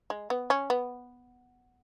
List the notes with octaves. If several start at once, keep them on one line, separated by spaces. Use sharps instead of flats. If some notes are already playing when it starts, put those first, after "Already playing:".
G#3
B3
C#4
B3